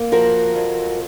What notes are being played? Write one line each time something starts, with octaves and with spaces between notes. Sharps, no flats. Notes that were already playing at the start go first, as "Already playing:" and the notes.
Already playing: A#3
F3 F#4 A#4
F2